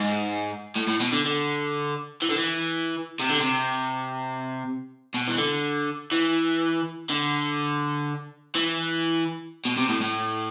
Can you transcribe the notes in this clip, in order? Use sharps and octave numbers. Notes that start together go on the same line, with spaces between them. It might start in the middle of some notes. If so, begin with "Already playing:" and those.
Already playing: G#2
A2
A2
B2
D3
D3
E3
D3
E3
C3
D3
C3
B2
E3
D3
E3
D3
E3
B2
C3
A2
A2